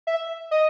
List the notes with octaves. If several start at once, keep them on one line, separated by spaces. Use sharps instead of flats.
E5
D#5